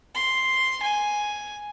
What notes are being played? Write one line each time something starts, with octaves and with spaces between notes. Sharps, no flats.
C6
G#5